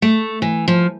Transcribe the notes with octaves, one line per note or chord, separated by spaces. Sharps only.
A3
E3
F3